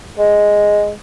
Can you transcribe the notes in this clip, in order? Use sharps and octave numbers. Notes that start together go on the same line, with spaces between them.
G#3